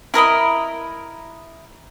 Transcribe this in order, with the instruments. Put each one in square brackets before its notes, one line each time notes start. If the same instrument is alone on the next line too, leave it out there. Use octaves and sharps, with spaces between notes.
[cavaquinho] E4 A#4 D#5 B5